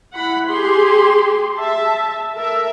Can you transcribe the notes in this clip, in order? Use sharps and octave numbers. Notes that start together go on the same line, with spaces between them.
E4 F#5 B5
G4 G#4 C6
E5 A5
A4 A#4 E5